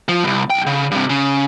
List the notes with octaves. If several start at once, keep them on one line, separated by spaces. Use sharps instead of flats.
F3
C2 G2
B1 G5
C#3
G2 C3
C#3